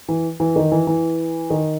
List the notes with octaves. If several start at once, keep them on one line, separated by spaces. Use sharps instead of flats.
E3
E3
D#3
E3
E3
D#3